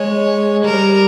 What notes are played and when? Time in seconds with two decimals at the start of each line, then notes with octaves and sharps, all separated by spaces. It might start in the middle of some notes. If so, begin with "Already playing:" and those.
Already playing: G#3 C#5
0.64 G3 A#4